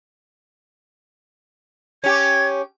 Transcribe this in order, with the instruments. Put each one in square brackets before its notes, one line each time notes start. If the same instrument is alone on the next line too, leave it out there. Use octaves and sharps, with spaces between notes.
[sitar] C#4 G4 [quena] G#6